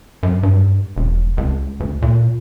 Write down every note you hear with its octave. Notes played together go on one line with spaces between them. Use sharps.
F#2
G2
E1
C#2
D2
A#2